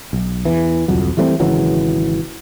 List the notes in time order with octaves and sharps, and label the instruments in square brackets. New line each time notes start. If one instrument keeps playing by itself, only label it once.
[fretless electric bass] B1
E2 E3
D1 C2 F2 F#3
E3 G3 A3 C4
G#1 C#3 E3 F#3